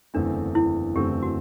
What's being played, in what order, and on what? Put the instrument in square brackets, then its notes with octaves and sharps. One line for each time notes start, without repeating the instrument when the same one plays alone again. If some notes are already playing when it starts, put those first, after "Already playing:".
[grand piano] F#1 E2 D3 A3 C4 [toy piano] D4
[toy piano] E4
[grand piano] F#1 E2 D3 A3 C4 [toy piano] G4
[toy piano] F#4